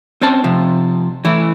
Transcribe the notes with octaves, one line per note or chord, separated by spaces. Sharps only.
C4 C#4 C5 A5
C3 F3
E3 A3 E4